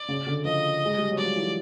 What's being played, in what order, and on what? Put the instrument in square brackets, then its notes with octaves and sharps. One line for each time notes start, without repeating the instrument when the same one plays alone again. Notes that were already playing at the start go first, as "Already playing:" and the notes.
Already playing: [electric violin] D5
[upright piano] C#3
D3
[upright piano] F3 [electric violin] D#5
[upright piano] G#3
G3
F#3
[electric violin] D5
[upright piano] F3
E3